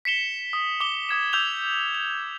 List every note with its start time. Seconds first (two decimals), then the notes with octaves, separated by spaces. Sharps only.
0.05 B6 C#7 E7 G7
0.53 D#6
0.80 D6 G7
1.09 D#6 G#6 E7
1.33 D6 E6 G6 F7 G7
1.95 F7